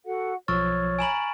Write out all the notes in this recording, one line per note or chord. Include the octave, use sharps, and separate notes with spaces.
F#4 A4 F#5
B1 F3 C#5 C#6 E6 F6 A6
G#5 A#5 B5 D7 E7 F#7